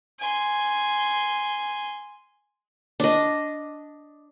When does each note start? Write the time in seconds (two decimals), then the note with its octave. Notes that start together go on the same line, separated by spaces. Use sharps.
0.20 G#5 C6
3.00 D4 D#5